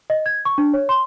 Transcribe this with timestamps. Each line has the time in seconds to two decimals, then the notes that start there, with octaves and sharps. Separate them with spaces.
0.10 D#5
0.26 G#6
0.45 C#6
0.58 D4
0.74 C#5
0.89 C6